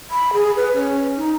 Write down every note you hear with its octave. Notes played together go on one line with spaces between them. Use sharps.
B5
G#4
B4
C#4
D#4